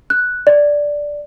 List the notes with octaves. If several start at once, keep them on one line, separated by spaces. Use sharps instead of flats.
F#6
D5